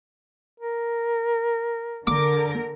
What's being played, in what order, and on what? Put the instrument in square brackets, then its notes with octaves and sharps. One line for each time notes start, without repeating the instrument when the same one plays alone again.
[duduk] A#4
[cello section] D3 A#4 [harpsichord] D6